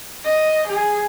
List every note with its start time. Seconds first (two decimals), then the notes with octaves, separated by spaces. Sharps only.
0.24 D#5
0.67 G#4